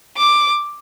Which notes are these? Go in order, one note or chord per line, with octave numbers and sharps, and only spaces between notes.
D6